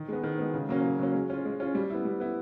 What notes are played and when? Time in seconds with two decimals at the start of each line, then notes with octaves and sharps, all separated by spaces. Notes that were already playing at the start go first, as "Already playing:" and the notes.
Already playing: D#3
0.08 G#3 B3
0.23 D#3
0.38 G#3 B3
0.54 C#3
0.69 F#3 A#3 C#4
0.84 C#3
0.99 F#3 A#3 C#4
1.14 G#3
1.30 C#4 F4
1.45 G#3
1.60 C#4 F4
1.75 G3
1.90 B3 E4
2.05 G3
2.20 B3 E4